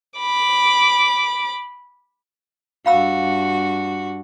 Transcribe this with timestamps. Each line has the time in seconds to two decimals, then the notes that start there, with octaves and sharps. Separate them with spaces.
0.18 B5 D6
2.86 G2 F#4 F5 B5 E6